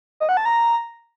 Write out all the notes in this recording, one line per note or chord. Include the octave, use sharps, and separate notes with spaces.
D#5
F#5
A5
A#5